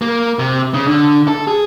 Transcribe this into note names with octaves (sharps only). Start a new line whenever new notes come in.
A#3
C3
C#3
D3
A4
G#4